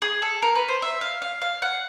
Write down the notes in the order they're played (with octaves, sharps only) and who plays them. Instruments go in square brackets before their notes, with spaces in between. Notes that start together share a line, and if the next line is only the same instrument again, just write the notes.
[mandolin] G#4
A4
A#4
B4
C5
E5
F5
F5
F5
F#5